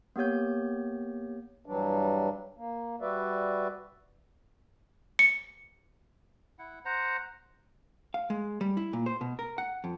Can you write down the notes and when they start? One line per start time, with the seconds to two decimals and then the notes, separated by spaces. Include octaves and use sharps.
0.16 A#3 B3 G4 C#5 G6
1.66 G2 E3 F#3 G3 D4
2.57 A#3
3.01 G3 F#4 B4 D5 E5
5.19 C#7
6.59 E4 F#5
6.85 C5 F#5 A#5
8.14 F5
8.30 G#3
8.61 G3
8.77 E4
8.93 A#2
9.06 C5
9.21 B2
9.39 A#4
9.58 F#5
9.84 F2